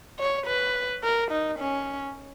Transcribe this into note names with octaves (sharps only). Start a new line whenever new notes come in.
C#5
B4
A#4
D#4
C#4